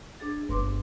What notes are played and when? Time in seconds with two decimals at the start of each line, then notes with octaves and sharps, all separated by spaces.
0.20 D4 G#4 A6
0.49 G1 B4 C6 D6